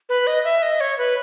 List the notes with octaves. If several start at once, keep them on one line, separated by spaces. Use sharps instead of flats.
B4
D#5
E5
D#5
C#5
B4